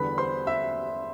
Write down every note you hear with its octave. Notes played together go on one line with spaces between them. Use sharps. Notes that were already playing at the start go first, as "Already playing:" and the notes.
Already playing: E2 D3 G3 B4 B5
C5 C6
E5 E6